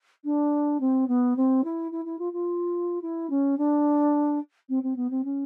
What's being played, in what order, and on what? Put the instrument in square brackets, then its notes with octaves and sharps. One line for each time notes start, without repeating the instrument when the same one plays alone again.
[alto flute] D4
C4
B3
C4
E4
E4
E4
F4
F4
E4
C#4
D4
C4
C4
B3
C4
C#4